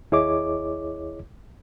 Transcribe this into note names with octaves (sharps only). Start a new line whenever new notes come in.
D#2 E4 G#4 C#5 D#5 D6